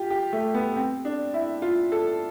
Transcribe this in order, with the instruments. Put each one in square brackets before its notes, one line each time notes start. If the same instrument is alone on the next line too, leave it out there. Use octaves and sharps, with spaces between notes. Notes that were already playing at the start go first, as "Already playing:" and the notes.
Already playing: [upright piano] F4 G4
G4
A3
B3
C4
D4
E4
F4
A4